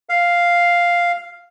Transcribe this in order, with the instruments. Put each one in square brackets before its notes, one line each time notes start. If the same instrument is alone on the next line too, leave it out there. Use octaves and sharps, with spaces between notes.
[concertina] F5